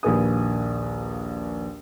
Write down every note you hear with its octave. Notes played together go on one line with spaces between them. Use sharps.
A#1 D#2 B4 G#5 D#6